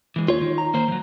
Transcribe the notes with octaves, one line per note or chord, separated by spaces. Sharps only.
E3 G#3
D#2 F4 C#5
D#3
A#5
A#3 C5
F3 F#3